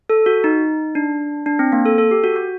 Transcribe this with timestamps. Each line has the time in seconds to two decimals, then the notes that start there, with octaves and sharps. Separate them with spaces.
0.09 A4
0.26 F#4
0.44 D#4
0.95 D4
1.46 D4
1.59 C4
1.72 A#3
1.86 A4
1.98 A4
2.11 G4
2.24 F#4
2.36 F#4